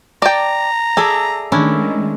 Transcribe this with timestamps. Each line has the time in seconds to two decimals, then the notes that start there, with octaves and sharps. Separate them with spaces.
0.22 D5 G5 A5 A#5
0.97 G#4 A4 D5 E5
1.52 D#3 G#3 A3 C#4 D4 E4